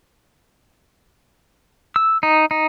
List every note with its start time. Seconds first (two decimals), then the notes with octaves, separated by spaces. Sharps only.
1.96 E6
2.23 D#4
2.51 D#4